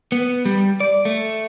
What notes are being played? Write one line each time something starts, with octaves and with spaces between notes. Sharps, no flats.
B3
G3
D5
A3